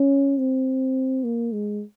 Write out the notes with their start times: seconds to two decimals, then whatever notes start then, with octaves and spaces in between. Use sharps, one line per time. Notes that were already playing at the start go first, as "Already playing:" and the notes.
Already playing: C#4
0.38 C4
1.24 A#3
1.53 G#3